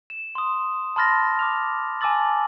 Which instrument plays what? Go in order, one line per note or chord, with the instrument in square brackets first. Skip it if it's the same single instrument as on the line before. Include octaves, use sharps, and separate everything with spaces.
[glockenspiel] E7
C6 D#6
A5 B5 C6 F6 A6 A#6
D6 F6 F7
G#5 A5 D6 E6 A6 F#7